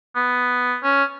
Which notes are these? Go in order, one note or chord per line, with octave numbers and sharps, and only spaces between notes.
B3
C#4